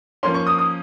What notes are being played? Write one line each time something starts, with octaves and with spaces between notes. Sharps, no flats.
F3 A#3 C#4 C6
C#6
D#6
D#6